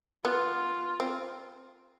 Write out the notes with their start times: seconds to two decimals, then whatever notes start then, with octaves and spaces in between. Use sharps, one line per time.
0.24 B3 F4
1.00 C4